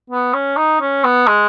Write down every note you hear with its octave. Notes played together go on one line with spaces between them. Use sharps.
B3
C#4
D#4
C#4
B3
G#3